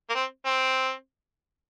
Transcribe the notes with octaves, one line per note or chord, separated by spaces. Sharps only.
A#3
C4
C4